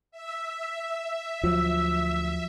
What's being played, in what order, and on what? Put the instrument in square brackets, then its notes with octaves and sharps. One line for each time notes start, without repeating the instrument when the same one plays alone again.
[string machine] E5
[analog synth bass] D2 [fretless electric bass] F3 F#3 [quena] E6